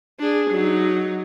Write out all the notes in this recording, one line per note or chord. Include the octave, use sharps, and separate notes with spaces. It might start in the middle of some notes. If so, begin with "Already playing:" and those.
D4 G#4
F#3 D#4